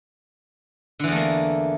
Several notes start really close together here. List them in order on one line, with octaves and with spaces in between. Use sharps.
D3 E3 E2 A3 A#3